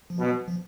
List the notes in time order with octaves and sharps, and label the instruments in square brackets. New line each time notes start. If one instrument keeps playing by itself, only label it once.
[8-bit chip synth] F3
[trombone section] B2 [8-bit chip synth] F#3
[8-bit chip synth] F3